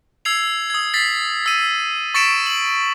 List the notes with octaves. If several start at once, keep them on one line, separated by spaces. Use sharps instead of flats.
E6 G#6 C7 F7
D#6 G#6
A6 B6 C7
E6 D#7
C#6 A6 B6 C#7 D7 E7
F#7